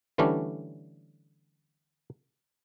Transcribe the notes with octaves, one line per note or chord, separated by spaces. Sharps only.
D3 E3 G3 A3 C#4 D4